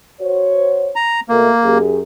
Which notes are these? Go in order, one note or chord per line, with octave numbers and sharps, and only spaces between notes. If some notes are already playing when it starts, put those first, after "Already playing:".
F#4 C5 C#5
A#5
B2 A3 A#3 A#4
F#2 G4 G#4